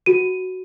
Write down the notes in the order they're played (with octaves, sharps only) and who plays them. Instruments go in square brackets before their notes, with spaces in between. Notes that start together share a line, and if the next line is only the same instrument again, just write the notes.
[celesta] F#4 D#7